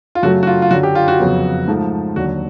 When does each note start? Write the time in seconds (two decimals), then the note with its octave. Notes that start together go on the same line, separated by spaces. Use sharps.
0.15 F4
0.23 F#2 C#3 F#3 A3 F#4
0.43 F#4
0.47 F4
0.62 F4
0.71 F#2 D3 F#3 F#4
0.83 G4
0.95 F4
1.08 F#4
1.19 F2 C#3 F#3 B3
1.68 G#2 F3 A3
2.16 D#2 D3 F#3 F#4